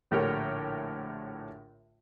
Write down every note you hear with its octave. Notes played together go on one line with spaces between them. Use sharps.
A#1 A2 D3 G4 A#4 C#5